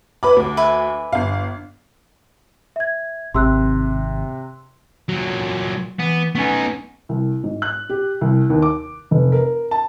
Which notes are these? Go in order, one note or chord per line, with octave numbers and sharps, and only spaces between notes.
B4 B5 D6
D2 D6
B4 E5 G#5
G1 F5
E5 G#6
G#1 C3 C6 E6 F#6
A#2 F#3
E3 B3
A3 B3 C#4 D#4 G#5
C2
G#2
F#6
G4
C2
D#2
D6
F1
A#4
A5